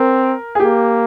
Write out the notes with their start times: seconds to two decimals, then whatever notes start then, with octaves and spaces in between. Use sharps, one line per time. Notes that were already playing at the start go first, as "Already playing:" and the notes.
Already playing: C4 A#4
0.55 G#4
0.60 A#3 G4